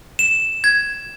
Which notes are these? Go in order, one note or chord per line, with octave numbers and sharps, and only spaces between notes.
E7
G#6